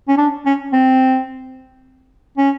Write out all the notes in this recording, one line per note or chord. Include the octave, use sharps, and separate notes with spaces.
C#4
D4
C#4
C4
C#4